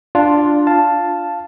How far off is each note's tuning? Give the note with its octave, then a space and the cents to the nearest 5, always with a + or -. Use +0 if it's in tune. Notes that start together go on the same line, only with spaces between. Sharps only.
D4 +0 F4 +0
F5 +0 A5 +0